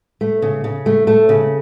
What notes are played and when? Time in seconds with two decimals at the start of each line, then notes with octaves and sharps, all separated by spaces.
0.21 A3
0.42 C#3
0.64 C#3
0.86 A3
1.07 A3
1.29 C#3